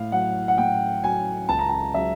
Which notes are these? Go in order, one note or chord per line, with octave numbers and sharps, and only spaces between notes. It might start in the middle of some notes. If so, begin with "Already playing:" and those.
Already playing: A2 F5
F#3 F#5
F#5
A2 G5
F#3 G#5
C#2 A5
A#5
A5
C#3 F#3 E5